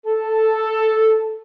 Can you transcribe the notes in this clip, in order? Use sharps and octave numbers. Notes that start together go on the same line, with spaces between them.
A4